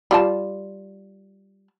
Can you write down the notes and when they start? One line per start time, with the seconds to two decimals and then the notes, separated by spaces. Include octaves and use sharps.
0.11 G3 F4 A5